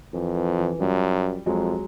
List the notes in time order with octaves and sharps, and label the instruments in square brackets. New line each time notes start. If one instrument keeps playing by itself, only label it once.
[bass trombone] F2 [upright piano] E3
[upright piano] E3
E3
[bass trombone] F#2 [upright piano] F3 G3
[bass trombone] F2 [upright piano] F#3 G#3